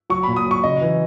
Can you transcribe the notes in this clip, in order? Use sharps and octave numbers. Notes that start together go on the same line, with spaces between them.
F#3 C#6
B5
A#2
D#6
F#3 C#6
C#3 D#5
E3